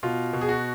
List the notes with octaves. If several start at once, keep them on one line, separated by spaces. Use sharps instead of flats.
B2 F4
B2
G#4
F#4